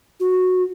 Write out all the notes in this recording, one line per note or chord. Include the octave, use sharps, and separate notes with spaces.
F#4